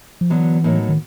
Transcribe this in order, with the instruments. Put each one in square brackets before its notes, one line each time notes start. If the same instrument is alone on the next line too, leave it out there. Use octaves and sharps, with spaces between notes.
[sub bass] F3
[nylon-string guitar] D3 F#3 B3 [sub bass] E3
[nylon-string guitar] A2 F#3 A#3 D#4
[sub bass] D#3